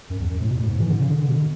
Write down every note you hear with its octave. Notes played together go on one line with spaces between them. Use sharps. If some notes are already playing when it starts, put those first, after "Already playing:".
F#2
E2
F#2
A2
B2
A2
G#2
E3
D3
C#3
D3
D3
B2